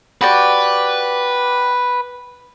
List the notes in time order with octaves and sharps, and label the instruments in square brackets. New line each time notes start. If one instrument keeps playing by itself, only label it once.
[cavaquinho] F#4 G4 D5 [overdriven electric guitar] B4